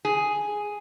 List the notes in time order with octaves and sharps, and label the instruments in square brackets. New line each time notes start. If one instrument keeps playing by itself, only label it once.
[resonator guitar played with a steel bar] G#4